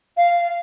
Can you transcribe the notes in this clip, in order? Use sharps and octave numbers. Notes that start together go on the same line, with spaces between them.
F5